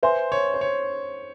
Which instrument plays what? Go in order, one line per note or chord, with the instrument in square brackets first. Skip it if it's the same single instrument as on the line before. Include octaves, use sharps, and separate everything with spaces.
[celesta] B4 E5 G#5 C6 [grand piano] C5
[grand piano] C#5
C5
C#5